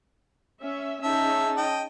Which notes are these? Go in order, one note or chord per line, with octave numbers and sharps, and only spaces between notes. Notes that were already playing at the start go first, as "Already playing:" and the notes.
C#4 E5
C#4 D#4 G#4 E5 A5
D#5 G5